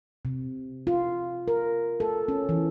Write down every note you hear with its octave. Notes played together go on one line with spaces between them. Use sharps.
C3
F4
A#4
A4
C#4
E3